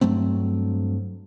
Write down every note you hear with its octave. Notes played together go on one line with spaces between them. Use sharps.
G2 F#3 A3 C4